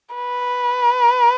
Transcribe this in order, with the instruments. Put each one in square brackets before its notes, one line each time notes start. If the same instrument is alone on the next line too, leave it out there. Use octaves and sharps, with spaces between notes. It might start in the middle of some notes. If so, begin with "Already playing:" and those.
[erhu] B4